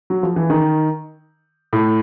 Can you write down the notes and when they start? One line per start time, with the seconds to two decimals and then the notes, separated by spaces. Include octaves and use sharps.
0.10 F#3
0.23 F3
0.36 E3
0.50 D#3
1.73 A2